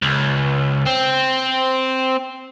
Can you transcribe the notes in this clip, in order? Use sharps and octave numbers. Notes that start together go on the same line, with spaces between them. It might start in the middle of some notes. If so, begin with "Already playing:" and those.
C#2
C4